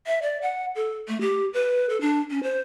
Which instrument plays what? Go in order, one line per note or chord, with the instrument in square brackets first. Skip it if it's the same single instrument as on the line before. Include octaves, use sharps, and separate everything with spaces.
[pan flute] E5
D5
F#5
A4
A3
G4
B4
A4
D4
C#4
C5